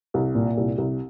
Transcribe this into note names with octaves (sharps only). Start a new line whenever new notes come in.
C2
A#2
C2
C2